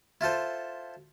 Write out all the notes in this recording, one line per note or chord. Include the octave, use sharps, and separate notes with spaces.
E4 F4 A4 C5